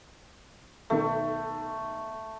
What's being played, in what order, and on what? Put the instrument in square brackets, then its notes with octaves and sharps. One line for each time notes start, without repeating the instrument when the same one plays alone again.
[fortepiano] B1 D#3 A4 [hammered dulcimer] A3